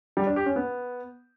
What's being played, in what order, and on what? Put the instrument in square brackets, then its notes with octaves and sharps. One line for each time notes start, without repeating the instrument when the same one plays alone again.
[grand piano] G3
D4
G4
C#4
B3